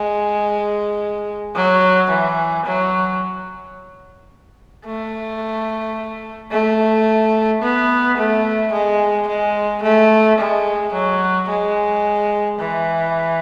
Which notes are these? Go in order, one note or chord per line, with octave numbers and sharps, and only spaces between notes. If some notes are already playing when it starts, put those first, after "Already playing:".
Already playing: G#3
F#3
E3
F#3
A3
A3
B3
A3
G#3
G#3
A3
G#3
F#3
G#3
E3